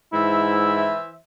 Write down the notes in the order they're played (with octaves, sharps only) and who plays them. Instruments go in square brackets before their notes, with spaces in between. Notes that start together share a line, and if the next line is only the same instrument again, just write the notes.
[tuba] G#2 [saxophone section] E3 C5 E5 [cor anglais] E4